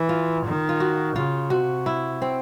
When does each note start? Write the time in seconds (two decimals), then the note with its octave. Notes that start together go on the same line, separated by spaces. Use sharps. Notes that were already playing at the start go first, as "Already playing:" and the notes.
Already playing: E3
0.09 F4
0.45 D#3
0.69 F4
0.80 F#4
1.16 C#3 F4
1.50 C3 F#4
1.86 E4
2.22 C4